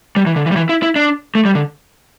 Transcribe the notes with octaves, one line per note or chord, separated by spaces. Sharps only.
G3
E3
D3
E3
G3
E3
E4
E4
D4
A3
G3
D3